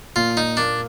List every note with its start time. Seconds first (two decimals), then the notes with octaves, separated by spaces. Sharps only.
0.16 A#2 F4
0.37 D#4
0.57 A#3 D4